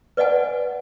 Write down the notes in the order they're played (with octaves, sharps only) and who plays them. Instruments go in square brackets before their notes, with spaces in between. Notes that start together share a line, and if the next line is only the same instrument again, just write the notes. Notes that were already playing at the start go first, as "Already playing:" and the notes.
[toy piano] B4 D5 D#5 F#5 G#5